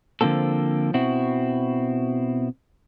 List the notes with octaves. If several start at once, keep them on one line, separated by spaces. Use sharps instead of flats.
D3 F3 A#3 C4 A4
B2 C4 E4 F#4